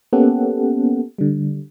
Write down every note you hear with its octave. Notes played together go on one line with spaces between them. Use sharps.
A#3 B3 C#4 G4 A4 F#5
D3 G3